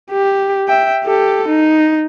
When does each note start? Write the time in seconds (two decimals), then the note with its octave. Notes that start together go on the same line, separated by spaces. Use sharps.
0.11 G4
0.68 E5 G5
1.05 G4 A4
1.49 D#4